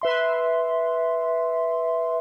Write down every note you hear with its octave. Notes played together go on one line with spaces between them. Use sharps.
B4 E5 C6